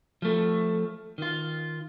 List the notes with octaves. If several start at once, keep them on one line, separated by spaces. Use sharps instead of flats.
F3 A3
D#3 F4